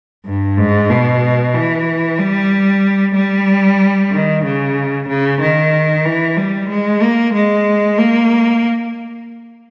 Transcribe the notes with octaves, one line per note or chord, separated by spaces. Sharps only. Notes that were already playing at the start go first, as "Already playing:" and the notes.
G2
G#2
B2
E3
G3
G3
D#3
C#3
C#3
D#3
E3
G3
G#3
A#3
G#3
A#3